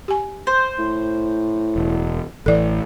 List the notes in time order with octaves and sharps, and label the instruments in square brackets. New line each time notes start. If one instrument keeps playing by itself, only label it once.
[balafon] G4 G#5
[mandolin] C5
[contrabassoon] A2
[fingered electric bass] E1
[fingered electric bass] A1 E3 [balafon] A4 D5